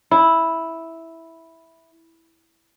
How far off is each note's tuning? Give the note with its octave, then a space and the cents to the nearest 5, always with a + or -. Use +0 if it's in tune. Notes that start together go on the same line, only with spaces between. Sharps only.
E4 -5